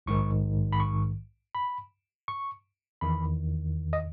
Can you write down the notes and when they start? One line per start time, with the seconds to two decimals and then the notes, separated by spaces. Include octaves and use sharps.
0.06 A#1 G#2 D#3 C#6
0.73 B5
0.80 C#6
1.55 B5
2.28 C#6
3.01 E2 D#3 B5
3.93 D#5